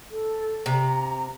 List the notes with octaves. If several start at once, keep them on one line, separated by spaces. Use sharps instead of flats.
A4
C3 A#5